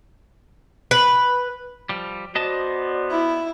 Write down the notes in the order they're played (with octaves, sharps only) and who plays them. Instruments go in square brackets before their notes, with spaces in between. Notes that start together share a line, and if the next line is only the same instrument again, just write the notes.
[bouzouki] B4
[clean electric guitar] F3 G3
[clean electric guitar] B3 D#5 A5 [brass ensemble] F#4 C5 D5
[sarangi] E4